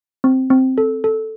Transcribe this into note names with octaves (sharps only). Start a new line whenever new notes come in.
C4
C4
A4
A4